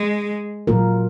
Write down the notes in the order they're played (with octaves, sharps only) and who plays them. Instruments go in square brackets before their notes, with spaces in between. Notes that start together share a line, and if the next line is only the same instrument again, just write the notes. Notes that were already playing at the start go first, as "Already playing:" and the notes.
Already playing: [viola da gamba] G#3
[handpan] A#2 F#3 A#3 F4 A#4